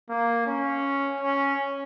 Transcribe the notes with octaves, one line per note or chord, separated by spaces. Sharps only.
A#3
C#4
C#4